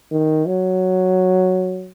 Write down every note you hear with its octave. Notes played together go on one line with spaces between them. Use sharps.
D#3
F#3